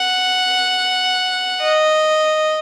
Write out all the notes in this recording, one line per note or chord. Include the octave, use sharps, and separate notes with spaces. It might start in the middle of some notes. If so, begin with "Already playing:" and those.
Already playing: F#5
D#5